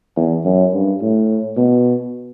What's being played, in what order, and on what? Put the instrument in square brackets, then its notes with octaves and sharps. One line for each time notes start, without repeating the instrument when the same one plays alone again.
[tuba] E2
F#2
G2
A2
B2